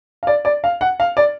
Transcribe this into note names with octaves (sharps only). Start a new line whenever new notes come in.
F5
D5
D5
F5
F#5
F5
D5